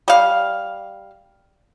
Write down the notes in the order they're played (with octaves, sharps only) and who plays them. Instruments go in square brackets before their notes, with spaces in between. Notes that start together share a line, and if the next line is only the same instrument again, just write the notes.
[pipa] G3 F5